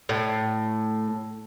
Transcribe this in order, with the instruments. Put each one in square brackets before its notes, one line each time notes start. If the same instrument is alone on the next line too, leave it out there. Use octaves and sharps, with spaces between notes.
[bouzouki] A2